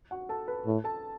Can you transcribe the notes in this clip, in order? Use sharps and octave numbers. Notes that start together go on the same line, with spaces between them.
F#4 F#5
A4 A5
B4 B5
A2
A4 A5